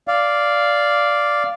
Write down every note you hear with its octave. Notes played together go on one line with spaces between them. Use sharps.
D5 F5